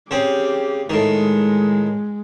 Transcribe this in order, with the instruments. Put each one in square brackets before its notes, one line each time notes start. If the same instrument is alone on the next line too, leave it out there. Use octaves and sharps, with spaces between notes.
[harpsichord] C#3 C4 [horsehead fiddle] G4
[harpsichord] A2 D#3 [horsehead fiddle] G#3